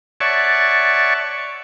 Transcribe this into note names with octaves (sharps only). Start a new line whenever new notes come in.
C#5 D5 E5 F#5 A5 C#6